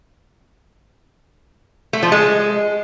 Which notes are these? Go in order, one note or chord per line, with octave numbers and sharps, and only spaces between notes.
A3
F3
G#3